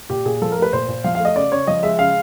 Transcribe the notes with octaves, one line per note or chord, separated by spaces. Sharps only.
A#2 G4
A#2 G#4
F3 A4
A#4
A3
B4
A#2 C5
A#2
F3 F5
A3 F5
D#5
C#3 D5
C#3 C#5
F3 D#5
G#3 E5
C#3 F5